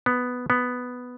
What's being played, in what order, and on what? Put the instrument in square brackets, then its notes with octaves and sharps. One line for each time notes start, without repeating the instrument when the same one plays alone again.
[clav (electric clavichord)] B3
B3